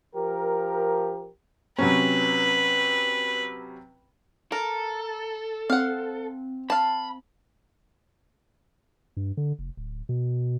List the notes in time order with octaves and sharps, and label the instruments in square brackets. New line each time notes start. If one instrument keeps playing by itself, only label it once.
[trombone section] F3 G4 A#4
[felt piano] C3 F#3 C#4 [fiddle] B4
[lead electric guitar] A4 [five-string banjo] A#4
[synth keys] C4 [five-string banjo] F5 F#5
[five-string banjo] F5 A5 [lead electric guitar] B5
[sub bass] G2
D3
F1
D1
B2